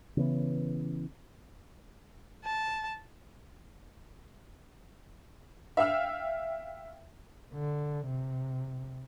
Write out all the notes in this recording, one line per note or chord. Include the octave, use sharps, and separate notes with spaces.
C#3 E3 B3
A5
E5 F5 G5 E6 F6
D3
C3